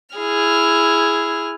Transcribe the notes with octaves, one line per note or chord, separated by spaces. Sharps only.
E4 G#4 F6